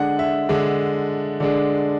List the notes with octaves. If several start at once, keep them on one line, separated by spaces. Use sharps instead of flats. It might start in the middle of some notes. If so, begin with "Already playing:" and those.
Already playing: D3 G#3 D4 F#5
E5
D3 G#3 D4
D3 G#3 D4